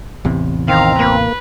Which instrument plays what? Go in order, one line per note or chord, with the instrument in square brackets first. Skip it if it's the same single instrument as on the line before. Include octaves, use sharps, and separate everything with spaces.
[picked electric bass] A1 E2 C3
[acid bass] D#3 [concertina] C4 [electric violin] F5 A#5
[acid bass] A#3 [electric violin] B4